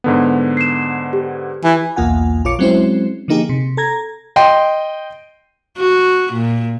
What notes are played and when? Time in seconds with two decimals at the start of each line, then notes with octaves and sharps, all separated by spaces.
0.04 G#2 D3 B3
0.57 C7 E7
1.13 G4
1.64 E3
1.96 B1 E2 A#3 F4 F#5 G#5
2.45 A#1 F4 C#5 D6 C#7
2.59 F#3 G#3 C4 C#4 E4 C5
3.28 D3 F3 A#3 D#4 G4 G#4
3.49 C3
3.77 A4 A#5 G#6 A#6
4.36 D#5 G5 C6
5.78 F#4
6.32 A#2